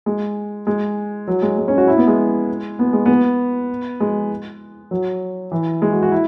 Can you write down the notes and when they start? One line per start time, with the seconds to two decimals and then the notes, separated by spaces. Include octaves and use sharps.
0.06 G#3
0.67 G#3
1.28 F#3
1.42 G#3
1.58 G#3
1.68 C#4
1.78 F#4
1.87 E4
1.98 B3
2.07 G#3
2.79 B3
2.93 G#3
3.06 B3
4.00 G#3
4.91 F#3
5.52 E3
5.82 G#3
5.92 F#4
6.03 F#4
6.11 E4